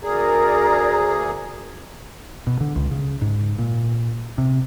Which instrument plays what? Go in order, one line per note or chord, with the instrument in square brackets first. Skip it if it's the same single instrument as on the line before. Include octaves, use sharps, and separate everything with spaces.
[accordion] D2 G#4 [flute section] A#4 D5 A#5
[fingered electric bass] B2
D3
C#2
C#3
G#2
A#2
C3